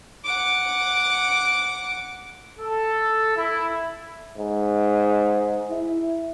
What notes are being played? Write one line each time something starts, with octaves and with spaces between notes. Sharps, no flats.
F#5 D6
A4
E4
G#2
E4